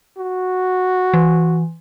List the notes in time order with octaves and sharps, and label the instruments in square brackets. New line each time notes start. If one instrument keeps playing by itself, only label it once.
[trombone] F#4
[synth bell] E3